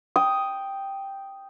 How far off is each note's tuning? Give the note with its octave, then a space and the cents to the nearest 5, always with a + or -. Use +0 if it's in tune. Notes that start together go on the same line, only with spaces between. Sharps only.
G5 +0 D#6 +0